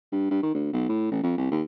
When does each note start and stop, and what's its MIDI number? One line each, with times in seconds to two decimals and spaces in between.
0.12 0.30 43
0.31 0.38 43
0.42 0.52 51
0.54 0.68 38
0.73 0.87 35
0.89 1.11 45
1.11 1.22 33
1.23 1.37 41
1.37 1.49 36
1.51 1.62 39